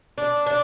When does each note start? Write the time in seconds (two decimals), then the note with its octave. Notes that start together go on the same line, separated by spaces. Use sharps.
0.18 D4
0.46 D4